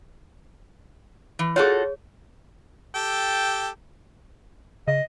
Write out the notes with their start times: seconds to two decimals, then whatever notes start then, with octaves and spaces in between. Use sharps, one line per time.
1.39 E3
1.56 F4 F#4 G#4 A4 C#5
2.95 G4 A4 G5
4.88 C#3 D#5